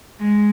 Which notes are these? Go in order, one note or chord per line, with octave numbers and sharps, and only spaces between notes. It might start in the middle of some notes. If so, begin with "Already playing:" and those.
G#3